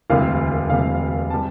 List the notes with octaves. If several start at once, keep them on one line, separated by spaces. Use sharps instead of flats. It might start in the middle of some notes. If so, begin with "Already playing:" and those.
E1 D2 C3 G3 F5
E1 D2 C3 G3 F5
C3 G3 A5